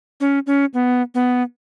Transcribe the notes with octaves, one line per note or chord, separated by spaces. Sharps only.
C#4
C#4
B3
B3